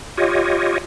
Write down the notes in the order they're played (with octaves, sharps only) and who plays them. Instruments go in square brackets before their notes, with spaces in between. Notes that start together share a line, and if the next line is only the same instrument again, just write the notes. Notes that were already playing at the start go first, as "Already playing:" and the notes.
[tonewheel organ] F4 G4 C#5 D#5